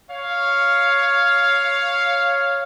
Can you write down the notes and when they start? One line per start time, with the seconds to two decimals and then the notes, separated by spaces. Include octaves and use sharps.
0.11 C#5 F5